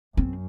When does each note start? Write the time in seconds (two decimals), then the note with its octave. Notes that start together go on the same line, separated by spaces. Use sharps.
0.17 F#2 C4